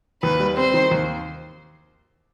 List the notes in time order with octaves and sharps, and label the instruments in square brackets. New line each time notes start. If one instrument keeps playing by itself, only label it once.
[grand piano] D#2 [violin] B4
[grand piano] G3
[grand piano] C4 [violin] C5
[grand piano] D#3
D#2